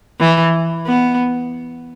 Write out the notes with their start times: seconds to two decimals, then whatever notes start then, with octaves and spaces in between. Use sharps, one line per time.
0.20 E3
0.87 B3